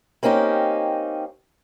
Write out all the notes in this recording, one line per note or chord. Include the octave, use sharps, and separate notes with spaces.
A#3 C4 C#4 D#4 G4